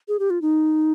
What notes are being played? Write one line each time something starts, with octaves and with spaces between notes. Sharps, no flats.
G#4
G4
F4
D#4